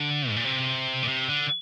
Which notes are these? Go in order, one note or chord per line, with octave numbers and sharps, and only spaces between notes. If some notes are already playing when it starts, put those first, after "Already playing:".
Already playing: D3
G#2
A#2
C3
A#2
C3
D3